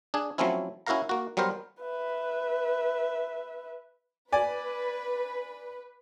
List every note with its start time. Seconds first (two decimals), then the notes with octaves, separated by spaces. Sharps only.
0.14 D4 G#4
0.38 F3 F#3 A3 C4 C#4 E4
0.86 C#4 E4 F#4 A#4 F5 A#5
1.09 A#3 F#4
1.37 F#3 G3 B3 A#4 C5
1.82 B4 E5
4.32 B4 D5 G#5